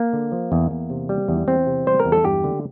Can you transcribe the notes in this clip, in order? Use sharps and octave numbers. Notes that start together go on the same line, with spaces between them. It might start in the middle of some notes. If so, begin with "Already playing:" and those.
Already playing: A#3
D3
F3
E2
E2
C3
G3
E2
E2 C4
C3
G3 C5
A#4
E2
A4
G2 G4
D3